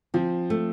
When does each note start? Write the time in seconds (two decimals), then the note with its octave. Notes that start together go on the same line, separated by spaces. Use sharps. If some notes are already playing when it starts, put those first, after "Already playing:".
0.14 F3 C4
0.50 A3